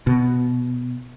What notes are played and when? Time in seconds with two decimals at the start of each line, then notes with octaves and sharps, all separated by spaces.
0.07 B2